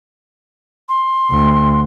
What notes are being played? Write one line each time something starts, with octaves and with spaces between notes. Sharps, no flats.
C6
D2